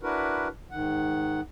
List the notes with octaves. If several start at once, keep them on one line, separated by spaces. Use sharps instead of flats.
D4 E4 F#4 A#4 B4
G#2 D#3 F#5